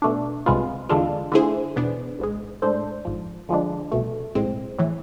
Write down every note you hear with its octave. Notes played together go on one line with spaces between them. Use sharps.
B2 A3 D4
C2 C3 G#3 B3 F4
E2 D3 G#3 D4 F4
D3 A3 E4 G#4 C5
E2 B2 B3 D4
A1 G#2 G#3
A2 G#3 D4 A4 C5
G#1 G#2 F3
D3 F3 G#3 D4
C2 B2 A3
B1 A2 G#3 C4
A2 E3